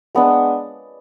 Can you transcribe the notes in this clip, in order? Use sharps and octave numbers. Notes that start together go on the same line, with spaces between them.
G#3 B3 D4